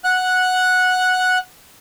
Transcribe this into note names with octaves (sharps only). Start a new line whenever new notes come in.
F#5 F#6